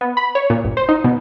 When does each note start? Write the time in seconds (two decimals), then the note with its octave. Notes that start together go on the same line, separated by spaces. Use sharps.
0.01 B3
0.17 B5
0.35 C#5
0.50 A#2
0.64 G1
0.77 C5
0.89 D#4
1.04 B2